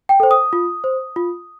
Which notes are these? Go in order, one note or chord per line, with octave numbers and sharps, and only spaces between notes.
G5
A4 C5
D#6
F4
C5
F4